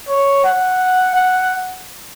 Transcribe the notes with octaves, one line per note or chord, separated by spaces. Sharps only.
C#5
F#5
F#5